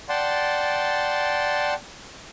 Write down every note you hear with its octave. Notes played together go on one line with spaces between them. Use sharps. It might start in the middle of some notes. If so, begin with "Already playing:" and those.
D5 F#5 G5 A5 C6